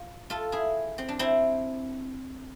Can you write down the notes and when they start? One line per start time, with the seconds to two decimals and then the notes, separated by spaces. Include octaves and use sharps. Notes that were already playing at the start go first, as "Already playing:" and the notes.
Already playing: F4
0.30 F4 A4
0.52 E4 G#4
0.98 C4
1.09 D4
1.19 C4 E4